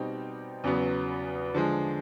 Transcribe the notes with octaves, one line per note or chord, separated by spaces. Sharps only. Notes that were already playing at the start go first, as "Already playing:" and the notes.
Already playing: B2 G3 C4 D#4 G4
E2 C#3 F#3 B3
D3 F3 G#3